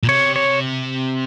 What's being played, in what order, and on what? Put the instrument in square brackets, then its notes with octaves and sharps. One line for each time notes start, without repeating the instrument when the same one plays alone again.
[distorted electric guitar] A#2
[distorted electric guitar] C3 [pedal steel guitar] C#5
[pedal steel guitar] C#5